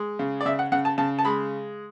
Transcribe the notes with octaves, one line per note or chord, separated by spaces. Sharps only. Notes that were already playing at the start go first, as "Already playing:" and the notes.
Already playing: G#3
C#3
D5
C#3 E5
F#5
C#3 F#5
A5
C#3 A5
A5
G#3 B5